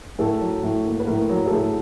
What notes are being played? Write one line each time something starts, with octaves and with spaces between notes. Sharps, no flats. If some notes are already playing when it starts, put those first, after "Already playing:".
A2 A4
F#3
A2
A#3
B4
A2 A#4
F#3
A4
A2 G#4